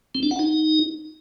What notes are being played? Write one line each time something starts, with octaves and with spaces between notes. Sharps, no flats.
C4
D4
F#5
D#4